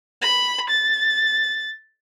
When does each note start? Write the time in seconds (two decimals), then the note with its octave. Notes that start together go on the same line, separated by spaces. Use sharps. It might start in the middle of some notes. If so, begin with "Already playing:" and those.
0.22 B5
0.70 A6